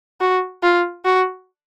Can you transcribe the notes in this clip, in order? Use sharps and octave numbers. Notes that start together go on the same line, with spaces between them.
F#4
F4
F#4